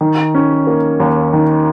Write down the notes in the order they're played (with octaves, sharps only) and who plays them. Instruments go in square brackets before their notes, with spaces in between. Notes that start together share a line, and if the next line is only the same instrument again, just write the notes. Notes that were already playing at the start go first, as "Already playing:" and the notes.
[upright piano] D#3
C#4
A#3
D#2
D#3